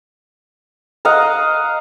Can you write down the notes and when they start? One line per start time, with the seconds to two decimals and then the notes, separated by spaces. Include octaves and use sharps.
1.05 D#5 F5 F#5 A#5